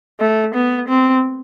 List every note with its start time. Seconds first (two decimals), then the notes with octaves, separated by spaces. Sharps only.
0.20 A3
0.55 B3
0.88 C4